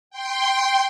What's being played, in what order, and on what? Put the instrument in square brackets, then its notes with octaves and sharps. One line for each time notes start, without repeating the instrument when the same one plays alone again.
[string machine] G5 C6